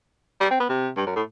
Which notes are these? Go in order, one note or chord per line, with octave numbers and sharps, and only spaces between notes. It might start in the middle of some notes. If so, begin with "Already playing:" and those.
G3
C4
B3
C3
G2
F#2
A2